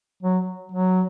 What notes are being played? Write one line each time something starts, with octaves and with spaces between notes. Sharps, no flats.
F#3
F#3